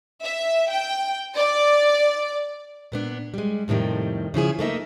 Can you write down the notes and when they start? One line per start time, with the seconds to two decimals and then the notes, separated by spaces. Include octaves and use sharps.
0.23 E5
0.70 G5
1.36 D5
2.92 A#2 B3 D4
3.34 G3 G#3
3.68 F2 A2 C3 D#3 G3
4.34 C#3 F3 E4 G#4
4.59 A3 A#3 D#4 E5